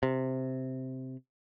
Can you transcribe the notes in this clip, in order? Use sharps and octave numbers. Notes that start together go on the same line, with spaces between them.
C3